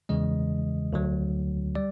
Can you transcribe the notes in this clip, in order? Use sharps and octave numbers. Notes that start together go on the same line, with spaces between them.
E2 C#3 E3 G#3 D#5
D2 D3 F#3
G3 D5